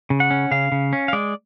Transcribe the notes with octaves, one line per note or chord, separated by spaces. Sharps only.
C#3
F#5
C#4
C#3 F5
C#3
C#4
F5
G#3 D5